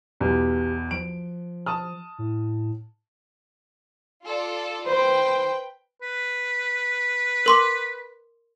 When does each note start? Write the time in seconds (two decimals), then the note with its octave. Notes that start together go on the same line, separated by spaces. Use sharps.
0.20 B1 E2 G4
0.91 F3 D7
1.66 A5 D#6 F6
2.18 A2
4.25 F4 A4 D5
4.87 B4 C5 G5
6.02 B4
7.46 A#4 C6 D6